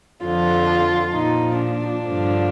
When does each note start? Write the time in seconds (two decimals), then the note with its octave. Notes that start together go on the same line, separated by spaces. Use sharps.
0.25 F2 D3 F3 F4
1.14 A#2 F3 D#4
1.60 D4
2.04 G2 D3 F3